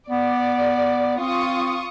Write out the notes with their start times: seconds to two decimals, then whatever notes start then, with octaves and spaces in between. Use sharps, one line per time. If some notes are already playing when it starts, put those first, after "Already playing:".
0.10 B3 D5
1.20 C4 F4 C#6 D#6